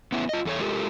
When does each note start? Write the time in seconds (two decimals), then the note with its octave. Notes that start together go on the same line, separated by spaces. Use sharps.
0.12 B3 C#4 E4
0.29 F4 D#5
0.45 E2 A4 C#5
0.60 G#3 F4 G4 A4 A#4